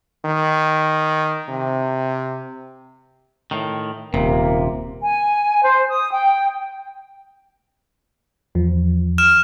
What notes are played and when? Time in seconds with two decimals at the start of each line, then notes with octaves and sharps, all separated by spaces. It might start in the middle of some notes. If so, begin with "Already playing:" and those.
0.25 D#3
1.49 C3
3.51 A2 D#3
4.14 D#1 C3 A#3
5.01 G#5
5.63 C5
5.90 D#6
6.11 G5
8.55 E2 F3
9.18 F6 E7